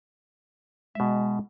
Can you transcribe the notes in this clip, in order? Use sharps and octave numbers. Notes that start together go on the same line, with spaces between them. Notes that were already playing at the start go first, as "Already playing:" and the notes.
B2 G#3 E5